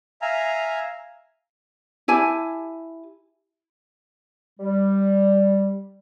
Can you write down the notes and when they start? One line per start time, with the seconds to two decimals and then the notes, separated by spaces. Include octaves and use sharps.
0.22 E5 F5 G#5 A#5
2.08 E4 G4 G#5 A5
4.60 G3